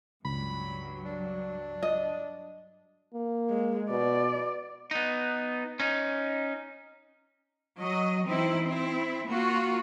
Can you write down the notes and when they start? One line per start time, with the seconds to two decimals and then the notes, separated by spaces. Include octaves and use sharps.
0.25 C#2 G2 F#3 B5
1.05 D4
1.83 D#5
3.14 A#3
3.49 G#3
3.90 B2 D5
4.91 B3 D#4
5.80 C#4 D#4
7.77 F#3 D#5
8.26 E3 C4 D#4 E4
8.63 C4 E4
9.29 A#3 F4 F#4